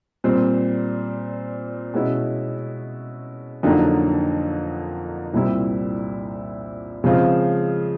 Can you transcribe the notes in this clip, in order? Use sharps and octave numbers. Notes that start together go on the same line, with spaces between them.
A#2 G3 C4
B2 G#3 C#4 E4
F2 D3 F#3 A#3 D#4
C2 A#2 G3 C4 E4
C#3 F3 G#3 C4 F4